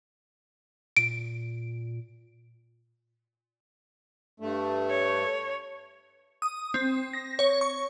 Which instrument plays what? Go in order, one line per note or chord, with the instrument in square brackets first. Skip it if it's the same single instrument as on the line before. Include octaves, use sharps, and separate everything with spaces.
[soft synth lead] A#2 [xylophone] D7
[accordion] G2 A3
[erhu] C#5
[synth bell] D#6
C4
A#6
C#5
C#6